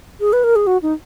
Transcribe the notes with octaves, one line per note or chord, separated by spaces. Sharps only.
G#4
B4
A#4
G#4
F#4
D#4